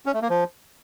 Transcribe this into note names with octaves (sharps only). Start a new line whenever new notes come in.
C#4
A3
A#3
F3